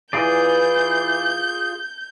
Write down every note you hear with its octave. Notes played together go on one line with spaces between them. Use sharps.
E3 F4 G#4 D5 G6